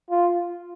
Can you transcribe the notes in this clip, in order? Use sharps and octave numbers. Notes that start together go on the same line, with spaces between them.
F4